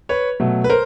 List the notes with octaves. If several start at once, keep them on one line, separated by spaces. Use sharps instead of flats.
B4 C#5
B2 F#3 A3
B4
A#4 C5